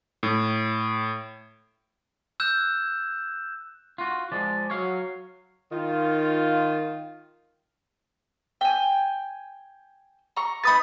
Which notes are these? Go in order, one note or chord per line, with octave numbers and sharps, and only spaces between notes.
A2
E6 F#6 G6 E7
F4 F#4
F3 G#3 D5
F#3 C#5 F5
D#3 F4
G5 G#5
A#5 C#6
D#4 B4 B5 D#6 A6